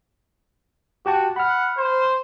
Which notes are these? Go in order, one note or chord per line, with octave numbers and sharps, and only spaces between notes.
F#4 G4 G5 A5
F#5 B5 F6
C5